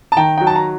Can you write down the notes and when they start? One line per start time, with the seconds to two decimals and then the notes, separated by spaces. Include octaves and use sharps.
0.12 A5
0.17 D#3 G5 A#5
0.38 F#3 G5
0.47 A5
0.56 A#5